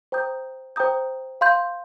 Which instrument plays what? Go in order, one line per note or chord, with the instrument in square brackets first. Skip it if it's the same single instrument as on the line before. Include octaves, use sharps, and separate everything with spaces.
[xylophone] C5 G5 A#5 D#6 G6
C5 G5 A#5 D#6 G6
F5 C6 G6